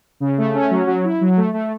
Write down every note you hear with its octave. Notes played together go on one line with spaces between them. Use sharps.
C#3
A3
C#4
F#3
F#3
E4
F#3
A3
A3